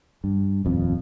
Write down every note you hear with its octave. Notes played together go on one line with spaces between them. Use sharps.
G2
D#1 F2